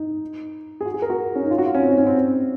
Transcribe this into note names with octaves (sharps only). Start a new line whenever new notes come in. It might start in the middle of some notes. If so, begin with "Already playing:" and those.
Already playing: D#4
G#4
F#4
G#4
A#4
F#4
C#4
D#4
F4
F#4
F4
C#4
C4
D#4
C#4
C4